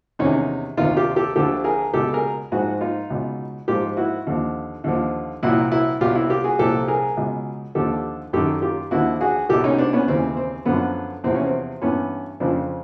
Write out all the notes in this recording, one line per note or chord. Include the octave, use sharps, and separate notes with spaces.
E2 C3 D#3 C#4 D#4
D2 C3 D#3 D#4 F4
F4 G4
G4 A4
D2 D3 F3 G4 A4
G#4 A#4
C#2 B2 G4 A4
G#4 A#4
G#2 F3 F#4 G#4
D#4 F4
C#2 B2
G#2 F3 F4 G4
E4 F#4
D#2 D3 F3
D#2 D3 F3
C2 A#2 F3 E4 F#4
E4 F#4
C2 B2 F4 G4
E4 F#4
F4 G4
F#4 G#4
C2 A#2 F3 G4 A4
G#4 A#4
C#2 B2
D#2 D3 F3 G4 A4
F#2 D#3 G4 A4
F4 G4
D#2 D3 F3 E4 F#4
F#4 G#4
C2 B2 G4 A4
C#4 D#4
C4 D4
B3 C#4
D#2 C#3 E3 C4
C4
F#2 D3 F3 B3
E2 C3 F3 C4
C#4
C4
G2 E3 B3 C#4
F2 C#3 F3 C4 D4